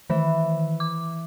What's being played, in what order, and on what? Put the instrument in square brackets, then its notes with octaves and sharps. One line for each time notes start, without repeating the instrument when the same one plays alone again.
[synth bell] D#3 [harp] E3
[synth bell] D6